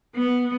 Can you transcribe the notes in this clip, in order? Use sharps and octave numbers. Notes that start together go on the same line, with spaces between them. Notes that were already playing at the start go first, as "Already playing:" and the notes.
B3